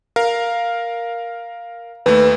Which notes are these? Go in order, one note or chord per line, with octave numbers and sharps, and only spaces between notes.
A#4 F5
D#2 A3 B4